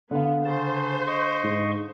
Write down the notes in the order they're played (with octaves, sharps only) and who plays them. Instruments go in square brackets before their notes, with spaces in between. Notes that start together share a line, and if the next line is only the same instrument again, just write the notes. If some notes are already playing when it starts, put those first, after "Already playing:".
[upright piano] D3 F5 [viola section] B3
[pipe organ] C#3 A5 [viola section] C5
[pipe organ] D#5 C6 C#6
[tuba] G#2